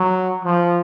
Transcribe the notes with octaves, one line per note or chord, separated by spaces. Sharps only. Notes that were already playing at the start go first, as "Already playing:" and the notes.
Already playing: F#3
F3